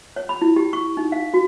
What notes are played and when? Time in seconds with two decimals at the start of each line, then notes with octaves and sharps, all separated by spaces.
0.16 C#5
0.29 B5
0.42 E4
0.56 G4
0.73 C#6
0.97 D#4
1.12 F5
1.34 F#4